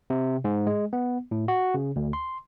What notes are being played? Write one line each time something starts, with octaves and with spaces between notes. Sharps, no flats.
C3
G#2
G#3
B3
A2
F#4
C#3
D2
C6